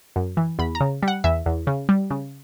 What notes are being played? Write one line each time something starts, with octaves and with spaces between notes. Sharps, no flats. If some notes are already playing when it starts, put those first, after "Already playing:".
F#2
E3
E2 B5
A#5
C#3
G3
F#5
E2 E5
E2
C#3
G3
C#3